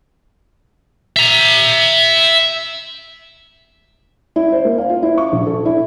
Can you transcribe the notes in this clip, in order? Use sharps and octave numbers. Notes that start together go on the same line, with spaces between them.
E5 A#5
E4
C5
A#3
F5
F4
E4
C#6
A#1
A4
E4